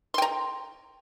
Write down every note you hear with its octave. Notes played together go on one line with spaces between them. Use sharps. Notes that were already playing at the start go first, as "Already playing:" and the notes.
G5 A#5 C6